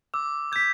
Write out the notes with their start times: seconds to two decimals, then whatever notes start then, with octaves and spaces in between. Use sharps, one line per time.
0.14 D6 E6
0.52 G6 G#6 B6